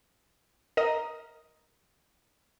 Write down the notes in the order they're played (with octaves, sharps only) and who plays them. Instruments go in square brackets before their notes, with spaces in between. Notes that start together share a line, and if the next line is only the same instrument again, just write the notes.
[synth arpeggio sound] A#4 D#5